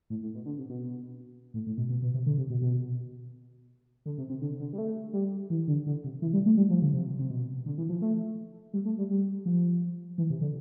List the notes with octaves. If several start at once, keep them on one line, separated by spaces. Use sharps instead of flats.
A2
A2
B2
D3
C3
B2
A2
A2
B2
B2
B2
C3
D3
C3
B2
B2
D3
C3
C3
D3
D3
G3
A3
G3
E3
D3
D3
C3
E3
G3
A3
G3
F3
D3
C3
C3
B2
D3
E3
F3
A3
G3
A3
G3
G3
F3
E3
C3
D3